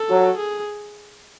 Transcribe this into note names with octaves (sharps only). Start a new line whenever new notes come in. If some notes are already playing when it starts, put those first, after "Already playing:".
Already playing: A4
F#3
G#4